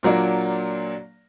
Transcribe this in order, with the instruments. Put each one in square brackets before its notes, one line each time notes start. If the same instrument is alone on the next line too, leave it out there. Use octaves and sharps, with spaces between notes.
[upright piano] A#2 F#3 A#3 D4